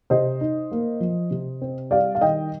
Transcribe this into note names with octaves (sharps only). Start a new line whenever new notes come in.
C3 C5 D#5
D#4
A#3
F3
C3
C4
G3 D5 F5
F5
D#3 D#5 G5